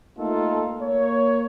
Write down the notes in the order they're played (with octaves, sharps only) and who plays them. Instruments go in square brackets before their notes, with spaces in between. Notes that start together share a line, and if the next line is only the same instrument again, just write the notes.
[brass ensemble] A3 A#3 D#4 F4 A4
A#3 C#5